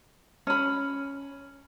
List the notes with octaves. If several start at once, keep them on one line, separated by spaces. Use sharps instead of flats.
C#4 B5